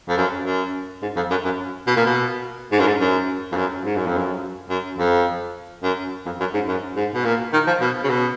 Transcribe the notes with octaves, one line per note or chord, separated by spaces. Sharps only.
F2
F#2
F#2
G#2
F2
F#2
F#2
B2
A#2
B2
G#2
F#2
G#2
F#2
F2
F#2
G#2
F#2
F2
F#2
F#2
F2
F#2
F2
F#2
G#2
F#2
G#2
B2
A#2
D#3
F3
B2
C#3
B2